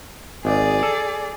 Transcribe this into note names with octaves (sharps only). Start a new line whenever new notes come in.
G#1 G#4 D5
A4